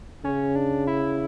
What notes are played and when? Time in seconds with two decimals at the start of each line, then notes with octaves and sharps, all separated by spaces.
0.24 C#3 C#4
0.55 D4
0.87 E4